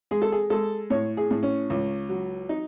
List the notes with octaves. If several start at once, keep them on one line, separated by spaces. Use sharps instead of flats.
G#3 G#4
A4
G#4
G#3 A4
A2 C#5
G#4
A2
C#4
C#2
F#3
D#4